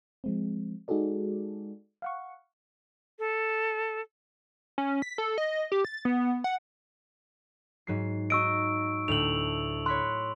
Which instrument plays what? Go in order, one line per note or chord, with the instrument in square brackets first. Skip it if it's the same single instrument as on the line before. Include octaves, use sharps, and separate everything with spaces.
[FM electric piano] F3 G#3 C4
G#3 D#4 F#4 G#4 A4 D5
F5 F#5 C#6
[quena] A4
[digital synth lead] C#4
B6
A4
D#5
G4
A6
B3
F#5
[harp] G#2 F#3 C7
[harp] D#4 F#4 D#5 [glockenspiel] C#6 E6 D7
[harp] D2 A2 E6 [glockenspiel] F7 F#7
[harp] C#5 B5 F#6 [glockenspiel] C6